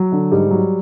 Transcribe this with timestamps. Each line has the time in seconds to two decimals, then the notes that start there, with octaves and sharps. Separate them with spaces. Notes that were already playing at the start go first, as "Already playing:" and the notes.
Already playing: F#3
0.12 D3
0.32 G#2 G3
0.51 F#3